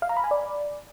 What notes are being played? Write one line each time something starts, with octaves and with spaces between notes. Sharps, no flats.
F5
A#5
B5
G#5
D5